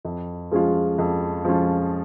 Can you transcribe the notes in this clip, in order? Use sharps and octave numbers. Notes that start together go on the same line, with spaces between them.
F2
F3 G#3 C#4 F4
F2
F3 G#3 C#4 F4